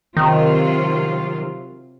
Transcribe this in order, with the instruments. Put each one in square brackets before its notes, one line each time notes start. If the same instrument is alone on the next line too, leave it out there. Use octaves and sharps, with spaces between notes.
[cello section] C3 F#3 F4 [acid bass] D#3